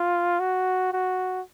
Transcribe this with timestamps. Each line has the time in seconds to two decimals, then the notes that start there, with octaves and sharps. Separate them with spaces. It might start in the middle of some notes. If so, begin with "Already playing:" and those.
Already playing: F4
0.40 F#4
0.93 F#4